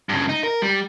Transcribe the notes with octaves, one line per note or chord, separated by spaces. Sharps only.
G2 C#3
D#4
A#4
G3